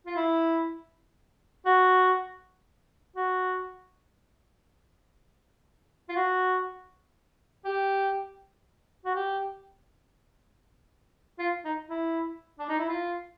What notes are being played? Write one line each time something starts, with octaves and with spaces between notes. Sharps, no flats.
F4
E4
F#4
F#4
F4
F#4
G4
F#4
G4
F4
D#4
E4
D4
D#4
E4
F4